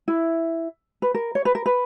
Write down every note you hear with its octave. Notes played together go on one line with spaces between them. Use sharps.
E4
B4
A#4
C#5
B4
A#4
B4